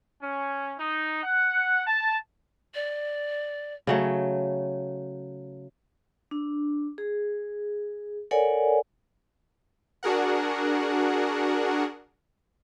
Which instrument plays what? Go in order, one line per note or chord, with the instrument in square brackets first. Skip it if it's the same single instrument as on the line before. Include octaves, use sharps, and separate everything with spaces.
[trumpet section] C#4
D#4
F#5
A5
[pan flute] D5
[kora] C#3 F#3 A3
[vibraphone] D4
G#4
A4 A#4 C#5 D5 F#5 G#5
[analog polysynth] D4 F#4 G#4 A#4 F#5